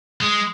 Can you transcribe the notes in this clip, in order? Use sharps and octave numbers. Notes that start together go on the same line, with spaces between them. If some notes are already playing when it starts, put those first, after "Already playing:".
G#3